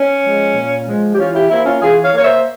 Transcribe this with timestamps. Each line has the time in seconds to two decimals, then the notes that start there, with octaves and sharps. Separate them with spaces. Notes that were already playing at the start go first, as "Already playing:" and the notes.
Already playing: C#4
0.23 F3 G#3
0.54 A#2
0.86 F3 G#3
1.14 G4
1.18 E3 C#4 F4
1.34 E4 G4
1.50 A#3 C4 E4
1.66 C#4 F4
1.82 E3 F4 G#4
2.03 C#5 F5
2.14 A#3 C#5
2.24 C5 E5